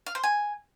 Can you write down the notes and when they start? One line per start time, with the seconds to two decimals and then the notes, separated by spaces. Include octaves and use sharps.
0.06 F5
0.15 C5
0.24 G#5